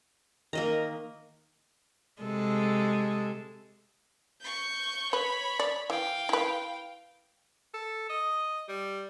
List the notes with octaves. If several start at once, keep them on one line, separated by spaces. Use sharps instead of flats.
D#3 A#3 D#5 A#5
C3 G#3 A4
C#6 G6
B4 C#5 B5
D5
E3 F5 G5
E4 B4
A4
D#5
G3